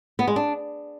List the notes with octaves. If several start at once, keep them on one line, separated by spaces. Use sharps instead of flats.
B3
G#3
D4